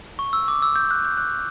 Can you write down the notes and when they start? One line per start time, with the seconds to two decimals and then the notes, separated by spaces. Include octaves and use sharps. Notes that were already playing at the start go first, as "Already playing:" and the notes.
0.19 C#6
0.33 E6
0.48 D6
0.62 E6
0.76 G6
0.91 F#6
1.05 G6
1.18 F#6